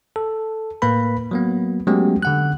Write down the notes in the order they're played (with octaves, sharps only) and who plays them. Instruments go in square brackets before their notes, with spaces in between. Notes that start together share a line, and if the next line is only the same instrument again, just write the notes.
[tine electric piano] A4
A2 A#3 B4 B5
F#3 A#3 B3
F#3 G#3 A3 B3 C#4 G4
D3 F#5 F#6